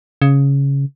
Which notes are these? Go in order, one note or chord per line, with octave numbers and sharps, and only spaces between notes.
C#3